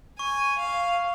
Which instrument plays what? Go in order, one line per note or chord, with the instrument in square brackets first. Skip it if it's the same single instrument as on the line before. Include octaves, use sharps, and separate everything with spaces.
[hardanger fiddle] G#5 [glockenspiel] C#6
[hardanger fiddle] F5